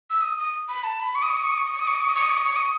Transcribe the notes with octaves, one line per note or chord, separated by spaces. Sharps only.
E6
D#6
D#6
B5
A5
B5
C#6
D#6
C#6
D#6
C#6
D#6
C#6
D#6
C#6
D#6
C#6
D#6
C#6
D#6
C#6
D#6
C#6
D#6
C#6
D#6